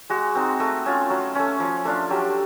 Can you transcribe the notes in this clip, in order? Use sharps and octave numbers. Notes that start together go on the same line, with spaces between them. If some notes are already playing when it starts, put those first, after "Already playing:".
G#3 F#4
C4 D#4
A3
C#4 F4
F#3
A3 C#4
F3
A3 D4 F4
F#3 G4